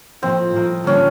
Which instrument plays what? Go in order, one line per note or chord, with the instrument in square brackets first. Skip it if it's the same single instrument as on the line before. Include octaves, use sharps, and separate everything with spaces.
[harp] A2 F3 A#3 D#4 [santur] C4
[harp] A2 F3 A#3 D#4
[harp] D3 G3 A#3 D4 [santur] C#4